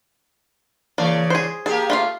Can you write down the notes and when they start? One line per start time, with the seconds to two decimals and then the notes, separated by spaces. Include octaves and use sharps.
0.98 C#3 E3 A#3 D5
1.30 G#4 C5
1.66 A#3 G4 G#4 A5
1.90 A3 F4 F5